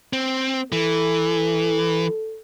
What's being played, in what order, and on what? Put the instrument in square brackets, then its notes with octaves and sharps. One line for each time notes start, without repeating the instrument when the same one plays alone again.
[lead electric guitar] C4
[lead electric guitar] E3 [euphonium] A4